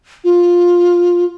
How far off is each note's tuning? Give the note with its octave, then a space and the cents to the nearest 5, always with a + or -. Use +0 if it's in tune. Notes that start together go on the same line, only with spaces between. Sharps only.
F4 +5